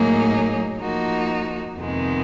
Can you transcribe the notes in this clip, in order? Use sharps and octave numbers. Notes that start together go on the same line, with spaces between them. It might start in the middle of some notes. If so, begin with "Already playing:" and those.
Already playing: A2 F#3 A#3 D#4 G#4
F3 A#3 D#4 F#4
F2 C3 D#3 G#3 B3